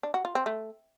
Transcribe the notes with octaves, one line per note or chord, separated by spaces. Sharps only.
D4
F#4
F4
C4
A3